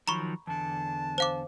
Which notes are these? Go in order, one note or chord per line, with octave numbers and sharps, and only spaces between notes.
D#3 F3 F#3 A#5 B5 C#6
E2 D3 A5
C5 F5 D6